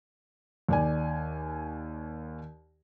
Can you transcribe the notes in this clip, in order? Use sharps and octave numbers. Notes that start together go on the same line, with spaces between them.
D#2 D5 G#5